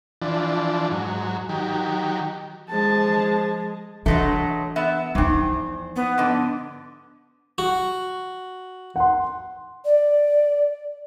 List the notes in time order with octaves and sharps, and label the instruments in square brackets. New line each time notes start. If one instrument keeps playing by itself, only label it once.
[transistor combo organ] E3 F3 D4
G#2 F#3
D#3 F#3 G4
[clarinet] F3 [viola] G#3 [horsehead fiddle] A5
[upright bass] E3 D4 [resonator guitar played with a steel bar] F#3 G#3 A3
[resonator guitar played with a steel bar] B3 E5
[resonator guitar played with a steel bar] E2 C4 [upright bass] F3 D#4
[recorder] B3
[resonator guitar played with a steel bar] G#2 D3
[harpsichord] F#4
[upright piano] F#5 C6
[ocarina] D5